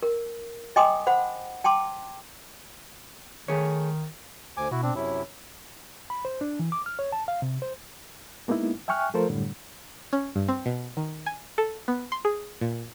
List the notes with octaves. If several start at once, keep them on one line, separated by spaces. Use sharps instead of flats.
A#4
D#5 G5 G#5 C6 D6 D#6
C5 F#5 B5
G5 A5 C6 D6
D#3 A3 G#4 C#5
D2 C5 G#5 D6
B2 E4 F#4
C4 D4
F#2 C3 E4 C#5
B5
C5
D4
E3
D6
F6
C#5
A5
F5
C3
C5
G#3 A#3 B3 D#4 E4
E5 G5 G#5 C#6 F6 F#6
F3 A3 F4 A4 A#4 C5
F#2 A2 D3 G3
C#4
G2
C4
B2
D#3
G#5
A4
B3
C6
G#4
A#2